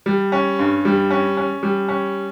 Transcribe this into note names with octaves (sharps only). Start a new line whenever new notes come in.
G3
C#4
G2
G3
C#4
C#4
G3
C#4